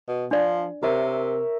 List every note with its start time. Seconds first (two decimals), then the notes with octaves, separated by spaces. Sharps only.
0.08 B2
0.31 F3 D4 D5
0.83 C3 A#4 C#5 E5